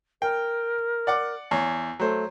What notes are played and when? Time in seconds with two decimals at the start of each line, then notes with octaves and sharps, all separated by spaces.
0.22 A#4 G5
1.07 D5 F#5 D6
1.51 E2 C#5
2.00 F#3 A3 C5